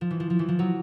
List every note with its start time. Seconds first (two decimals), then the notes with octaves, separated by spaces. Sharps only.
0.01 F3
0.11 E3
0.20 F3
0.30 F3
0.39 E3
0.49 F3
0.59 F#3